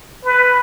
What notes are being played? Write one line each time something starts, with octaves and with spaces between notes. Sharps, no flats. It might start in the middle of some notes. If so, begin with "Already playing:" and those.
B4